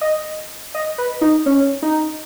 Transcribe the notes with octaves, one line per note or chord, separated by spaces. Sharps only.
D#5
D#5
B4
D#4
C#4
D#4